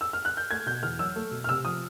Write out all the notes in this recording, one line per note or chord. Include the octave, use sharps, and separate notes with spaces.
E6
F6
F#6
G6
A3 G#6
B2 G6
E2 F6
F#3 E6
A3
B2
F6
C3 E6
F3 D#6